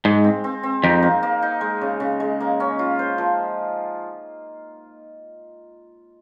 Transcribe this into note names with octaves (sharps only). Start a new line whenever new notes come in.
G#2 G#3
C4
C4
C4
F2 D#4
A#3
A#3
D#4
G#3
C#3
C#3
G#3
A#3
C#4
F4
C5
F3